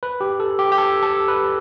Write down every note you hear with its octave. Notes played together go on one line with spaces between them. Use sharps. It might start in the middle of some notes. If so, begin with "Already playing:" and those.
B4
G4
A4
G4
G4
A4
A4
B4